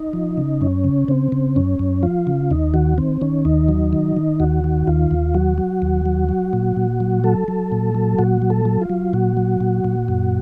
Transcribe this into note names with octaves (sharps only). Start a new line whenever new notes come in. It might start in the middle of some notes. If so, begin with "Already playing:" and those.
Already playing: D#4
F3
C#3
F#2 C#4
C#3
C#3 C4
C#3
F#2 C#4
F#2
F3 F4
C#3
D#2 D#4
D#3 F#4
D#3 C4
D#3 C#4
D#2 D#4
F#3
D#3
D#3
D#2 F#4
D#3
D#2 F4
D#2
F#3 F#4
F#3
D#2
F#3
F#3
A#2
A#2
F#3
F#3 A4
F#3
A#2
F#3
A#2 F#4
F#3
A4
F#3
F4
F#3
A#2 F#4
F#3
A#2
A#2
F#2